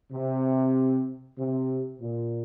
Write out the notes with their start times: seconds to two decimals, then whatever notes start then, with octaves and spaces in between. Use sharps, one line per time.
0.13 C3
1.38 C3
2.01 A#2